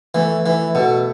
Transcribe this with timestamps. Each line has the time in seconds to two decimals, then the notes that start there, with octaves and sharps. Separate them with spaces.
0.15 E3 A3
0.45 E3 E4
0.75 B2 A4